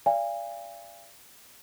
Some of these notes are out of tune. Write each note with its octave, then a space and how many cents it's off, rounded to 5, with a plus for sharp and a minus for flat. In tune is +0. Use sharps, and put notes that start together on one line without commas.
D5 -5 F5 -35 G#5 -35